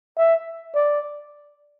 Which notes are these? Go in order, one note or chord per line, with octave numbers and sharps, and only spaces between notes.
E5
D5